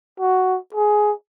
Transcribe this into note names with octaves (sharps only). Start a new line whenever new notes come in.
F#4
G#4